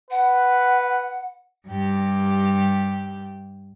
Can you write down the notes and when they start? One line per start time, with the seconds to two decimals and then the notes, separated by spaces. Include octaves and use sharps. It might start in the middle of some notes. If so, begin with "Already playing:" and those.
0.10 B4 F#5
1.68 G2 G4